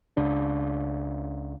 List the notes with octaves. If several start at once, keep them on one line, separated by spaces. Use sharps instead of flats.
C#2 C#3 D4